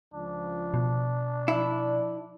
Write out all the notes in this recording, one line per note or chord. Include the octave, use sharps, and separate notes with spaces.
C#2 F3 D4
B2
F3 E4 D5